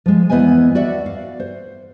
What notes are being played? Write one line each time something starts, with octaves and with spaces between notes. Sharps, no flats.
F3 G#3
E2 B3 C5 D#5 G#5
F#4 D5 E5 F#5
F5
C5